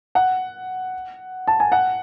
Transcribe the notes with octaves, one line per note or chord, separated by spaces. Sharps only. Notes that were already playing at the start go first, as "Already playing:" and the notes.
F#5
A5
G#5
F#5